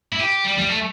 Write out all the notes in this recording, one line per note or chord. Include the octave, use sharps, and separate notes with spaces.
E4
G4
G3
G3
A3